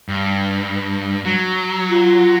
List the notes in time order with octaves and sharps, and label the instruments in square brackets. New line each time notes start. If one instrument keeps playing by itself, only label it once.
[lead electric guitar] G2
F#3
[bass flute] F4